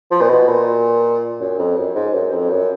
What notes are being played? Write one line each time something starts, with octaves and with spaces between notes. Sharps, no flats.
F3
A#2
B2
A#2
F#2
F2
F#2
G#2
F#2
F2
F#2